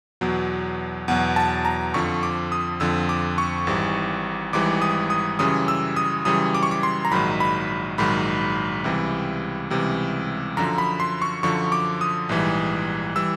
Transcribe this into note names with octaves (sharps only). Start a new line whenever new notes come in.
E2 B2 F#3
E2 B2 F#3 F#5
A5
A#5
F2 D3 F3 C#6
D6
D#6
F2 D3 F3 E6
D6
C#6
G#1 G#2 E3 G3
G#1 G#2 E3 G3 D6
D#6
D#6
F#2 C#3 E3 G3 D#6
E6
D#6
F#2 C#3 E3 G3 D#6
D6
C#6
D6
C6
A#5
A#1 G#2 D#3 F#3 B5
B5
A#1 G#2 D#3 F#3 B5
C#2 C3 E3 G3
C#2 C3 E3 G3
F#2 D3 F3 A#5
B5
C6
C#6
F#2 D3 F3 C#6
D6
D#6
A#1 G#2 E3 G3
E3 G3 E6